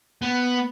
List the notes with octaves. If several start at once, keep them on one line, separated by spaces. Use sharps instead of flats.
B3